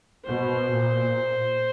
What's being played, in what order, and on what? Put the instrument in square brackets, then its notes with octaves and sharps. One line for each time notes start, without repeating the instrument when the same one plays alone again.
[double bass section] B2 [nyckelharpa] C5
[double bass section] A#2